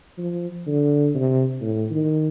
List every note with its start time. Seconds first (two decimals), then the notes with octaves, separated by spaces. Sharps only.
0.18 F3
0.67 D3
1.14 C3
1.61 A2
1.91 D#3